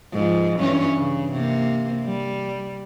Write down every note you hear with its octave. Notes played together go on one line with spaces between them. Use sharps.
G#2 F3
G2 E3 C#4
C#3
C3 A#3
G3